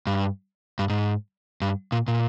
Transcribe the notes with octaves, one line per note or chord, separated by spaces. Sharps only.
G2
G2
G#2
G2
A#2
A#2